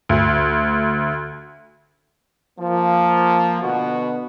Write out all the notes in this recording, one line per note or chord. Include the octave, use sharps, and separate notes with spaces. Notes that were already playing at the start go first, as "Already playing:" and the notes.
D2
F3 A#3
B2 D3 B3 F#4